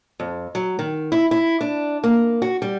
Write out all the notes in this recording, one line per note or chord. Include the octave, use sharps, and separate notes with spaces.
F2
F#3
D#3
E4
E4
D4
A#3
F#4
G3